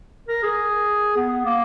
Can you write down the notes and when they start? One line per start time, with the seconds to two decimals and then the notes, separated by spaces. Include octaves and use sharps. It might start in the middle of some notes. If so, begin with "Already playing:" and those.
0.28 A#4
0.43 G#4
1.16 B3
1.45 A#3